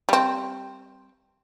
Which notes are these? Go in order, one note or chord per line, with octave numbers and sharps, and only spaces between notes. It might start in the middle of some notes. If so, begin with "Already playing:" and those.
G3 C4